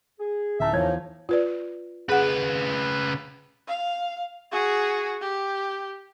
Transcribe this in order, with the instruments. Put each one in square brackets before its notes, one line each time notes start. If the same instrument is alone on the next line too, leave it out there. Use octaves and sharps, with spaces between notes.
[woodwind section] G#4
[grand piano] D1 A5 [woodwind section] A#3 C#4 D#4 [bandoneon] E5
[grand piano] E2 G#6 [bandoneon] F3 [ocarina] C#5
[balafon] F4 B4 D5
[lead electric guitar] C#3 B4 [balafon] G#4 F#5
[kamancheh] F5
F#4 G#4
G4